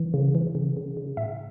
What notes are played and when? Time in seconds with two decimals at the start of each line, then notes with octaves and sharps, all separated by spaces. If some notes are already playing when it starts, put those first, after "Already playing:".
Already playing: E3
0.14 C#3
0.35 E3
0.55 C#3
0.77 C#3
0.97 C#3
1.17 A2 E5